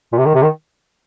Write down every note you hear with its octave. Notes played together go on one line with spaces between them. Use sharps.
A#2
C3
D#3
C3
D#3